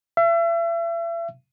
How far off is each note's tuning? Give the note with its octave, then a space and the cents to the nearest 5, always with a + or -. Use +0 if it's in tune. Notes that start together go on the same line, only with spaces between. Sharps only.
E5 +35